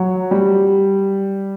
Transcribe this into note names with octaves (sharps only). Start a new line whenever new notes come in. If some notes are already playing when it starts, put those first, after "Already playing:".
Already playing: F#3
G3